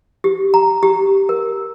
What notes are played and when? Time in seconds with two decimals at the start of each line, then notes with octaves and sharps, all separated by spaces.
0.24 G4
0.54 A#5
0.83 G4
1.29 A#4